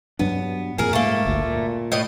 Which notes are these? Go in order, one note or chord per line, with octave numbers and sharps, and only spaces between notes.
G2 F#3 B3 D4
F2 A#2 G#4 A#4
G#2 A3 A#3
G1 D2
A#2
A2 D#5